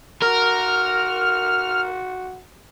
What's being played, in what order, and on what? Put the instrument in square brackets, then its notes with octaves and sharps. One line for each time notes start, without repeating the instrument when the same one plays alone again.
[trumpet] F#4 [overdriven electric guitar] A#4 [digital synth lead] F6